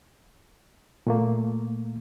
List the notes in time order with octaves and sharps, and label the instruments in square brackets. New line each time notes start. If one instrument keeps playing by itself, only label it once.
[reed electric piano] A#2 A3 A#3